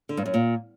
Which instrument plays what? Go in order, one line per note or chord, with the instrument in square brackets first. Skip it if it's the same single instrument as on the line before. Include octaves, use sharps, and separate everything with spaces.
[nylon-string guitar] D3
G2
F#2
A#2